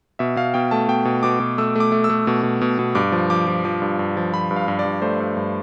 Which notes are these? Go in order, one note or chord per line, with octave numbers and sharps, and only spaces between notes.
B2 E5
B2 F5
B2 G5
A3 A5
B2 G5
B2
B2 D6
B2
A3 E6
A3 D6
A3
E6
A3
B2
B2
B2
B2
G2 D6
F3
F3 D6
F3
F3 D6
G2
G2
F3
F3 B5
G2
F5
G2
D5
G2
A3 C5
G2
G2